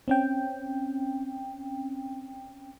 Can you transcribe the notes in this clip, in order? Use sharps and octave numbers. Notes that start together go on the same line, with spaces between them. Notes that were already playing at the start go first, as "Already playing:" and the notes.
C4 C#4 G5